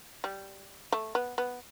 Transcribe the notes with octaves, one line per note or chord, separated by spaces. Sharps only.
G3
A3
B3
B3